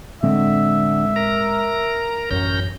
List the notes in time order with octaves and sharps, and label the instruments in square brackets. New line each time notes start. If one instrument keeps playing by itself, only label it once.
[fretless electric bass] A2 G#3 C4 [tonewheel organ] D3 [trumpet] E5
[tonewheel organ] A#4 A#5
[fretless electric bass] A1 F#2 [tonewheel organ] C#4 A#5 G6